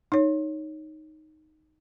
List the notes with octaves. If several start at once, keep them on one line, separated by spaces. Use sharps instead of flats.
D#4 C#5